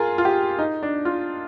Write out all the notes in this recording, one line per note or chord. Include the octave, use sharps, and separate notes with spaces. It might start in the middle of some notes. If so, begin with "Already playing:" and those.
Already playing: F4 G#4 A#4
F4
G4
D#4
D4
F4